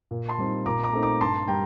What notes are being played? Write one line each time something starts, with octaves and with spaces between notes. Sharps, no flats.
A#2
A5 C6
G3 C4 D#4
A#2 A#5 D6
A#5 D6
A3 C4 D#4
A#5 D6
G2 A5 C6
G3 G5 A#5